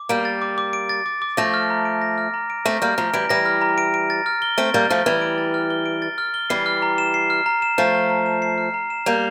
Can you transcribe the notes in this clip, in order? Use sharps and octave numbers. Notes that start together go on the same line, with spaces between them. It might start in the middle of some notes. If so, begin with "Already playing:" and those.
Already playing: D6
G3 A#3 D7
A6
D6
D6
D7
A6
D6
D6
F3 A3 A#6
F6
A#5
D7
A#6
F6
A#5
D7
A3 C4 A#6
G3 A#3 F6
F3 A3 A#5
E3 G3 D7
E3 G3 A#6
F6
A#5
D7
D7
A6
F6
G7
A3 C4 D7
G3 A#3 A6
F3 A3 F6
E3 G3 G7
D7
A6
F6
G7
D7
A6
F6
G7
E3 G3 C7
F6
A#5
E7
C7
F6
A#5
E7
F3 A3 C7
F6
A#5
E7
C7
F6
A#5
E7
G3 A#3 F7